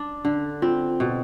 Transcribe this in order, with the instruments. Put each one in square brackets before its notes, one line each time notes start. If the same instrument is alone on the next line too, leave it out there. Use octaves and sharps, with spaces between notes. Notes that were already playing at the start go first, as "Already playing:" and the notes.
Already playing: [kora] D4
D3
[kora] C4 [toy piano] F4
[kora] B2